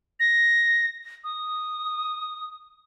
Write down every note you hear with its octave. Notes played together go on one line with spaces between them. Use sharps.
A#6
D#6